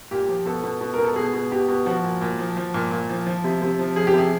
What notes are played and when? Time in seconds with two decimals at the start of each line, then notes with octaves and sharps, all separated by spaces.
0.11 A#2 G4
0.29 F3
0.46 B2 A4
0.64 B2
0.81 B2
0.94 B2 A#4
1.04 A4
1.16 B2 G#4
1.34 B2
1.52 B2 G4
1.68 B2
1.86 F3 F#4
2.04 A#2
2.21 A#2
2.39 F3
2.57 F3
2.74 A#2
2.91 A#2
3.09 F3
3.27 F3
3.44 C3
3.62 C3
3.79 F3
3.96 F3 G#4
4.07 G4
4.14 C3 G#4